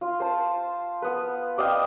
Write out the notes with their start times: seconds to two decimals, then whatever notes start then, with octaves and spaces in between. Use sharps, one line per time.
0.01 F4
0.20 C5 A5
1.02 B3 B4
1.58 D5 D#5 F5 G5